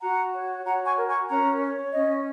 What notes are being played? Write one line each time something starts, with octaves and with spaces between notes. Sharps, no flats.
F#4 F#5 A#5
C#5
F#4 F#5 A#5
G#5 C#6
A#4
G#5 C#6
C#4 F#5 A#5
C#5
C#4 D#5